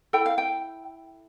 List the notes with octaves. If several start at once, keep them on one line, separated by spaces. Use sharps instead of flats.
E4 A4 G5
F5
G5